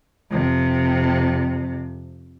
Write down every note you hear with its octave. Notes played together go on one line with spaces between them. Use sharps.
F2 C3